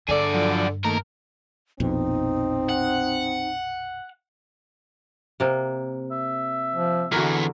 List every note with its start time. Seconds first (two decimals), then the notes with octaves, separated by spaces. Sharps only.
0.09 G2 D3 G#4 D5
0.34 F3 F#3
0.84 D#3 A3 A#3 A#4
1.80 A#1 F2 B2 C4 D#4
2.69 F#5
5.40 C3 A#3
6.11 E5
6.75 F3
7.12 E2 D3 E3 F#4 A#4